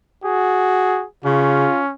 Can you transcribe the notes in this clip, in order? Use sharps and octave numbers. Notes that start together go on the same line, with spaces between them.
F#4 G#4
C#3 C#4 F4